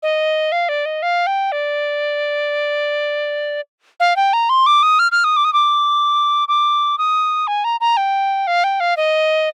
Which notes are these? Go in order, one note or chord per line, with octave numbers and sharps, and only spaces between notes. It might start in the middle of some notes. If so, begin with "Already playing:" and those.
D#5
F5
D5
D#5
F5
G5
D5
F5
G5
A#5
C6
D6
D#6
F6
F6
D#6
D6
D#6
D6
D6
D#6
G#5
A#5
A#5
G5
F5
G5
F5
D#5